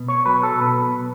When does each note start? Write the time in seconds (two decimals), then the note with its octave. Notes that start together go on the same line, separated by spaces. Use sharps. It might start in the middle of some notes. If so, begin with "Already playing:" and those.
Already playing: B2
0.08 C#5
0.26 F#3 B4
0.43 A4
0.61 B2 B4